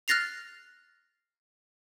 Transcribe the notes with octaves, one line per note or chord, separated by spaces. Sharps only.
F6 F#6 A6 A#6 C7 F7